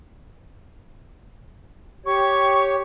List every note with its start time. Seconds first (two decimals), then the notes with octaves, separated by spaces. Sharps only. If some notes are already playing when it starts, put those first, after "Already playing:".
2.06 G4 C#5 C#6